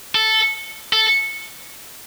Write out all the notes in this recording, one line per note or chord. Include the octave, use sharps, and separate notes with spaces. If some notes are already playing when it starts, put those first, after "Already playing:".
A4
A4